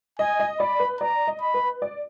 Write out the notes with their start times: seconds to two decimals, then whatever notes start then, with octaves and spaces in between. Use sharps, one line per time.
0.19 D#5 G#5
0.40 D#5
0.60 D5 B5
0.80 B4
1.01 D5 A#5
1.27 D#5
1.42 B5
1.54 B4
1.82 D5